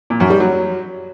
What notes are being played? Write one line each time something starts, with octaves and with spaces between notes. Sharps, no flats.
A#2
F#2
G3
F#3